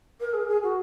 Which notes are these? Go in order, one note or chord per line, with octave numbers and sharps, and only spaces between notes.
A#4
G#4
G#4
F#4